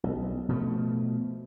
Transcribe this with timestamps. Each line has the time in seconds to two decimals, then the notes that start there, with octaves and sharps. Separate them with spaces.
0.03 B1
0.49 B2 F3 A3